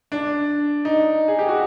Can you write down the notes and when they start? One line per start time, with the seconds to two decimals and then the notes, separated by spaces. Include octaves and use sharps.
0.12 D4
0.85 D#4
1.28 G#4
1.39 G4
1.48 F#4